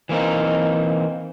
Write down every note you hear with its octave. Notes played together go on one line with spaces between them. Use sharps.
E3 A#3 C4 D#4